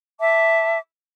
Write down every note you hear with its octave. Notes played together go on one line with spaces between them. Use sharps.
E5 A5 D6